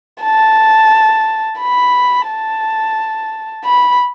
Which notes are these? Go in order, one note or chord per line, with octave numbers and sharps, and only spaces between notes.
A5
B5
A5
B5